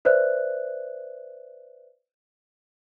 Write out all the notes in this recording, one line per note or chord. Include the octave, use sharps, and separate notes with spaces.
B4 C5 D5 E5 F#6